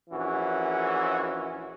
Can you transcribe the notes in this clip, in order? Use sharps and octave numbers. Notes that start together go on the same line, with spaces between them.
A#1 E3 C#4 F#4